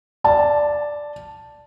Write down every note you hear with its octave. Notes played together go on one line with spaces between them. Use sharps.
D5 A5